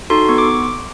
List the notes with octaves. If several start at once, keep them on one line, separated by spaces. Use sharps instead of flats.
D#4 F#4 A4 C6
B3 C#6
D6